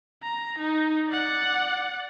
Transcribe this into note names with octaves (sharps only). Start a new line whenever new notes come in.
A#5
D#4
D5 F#5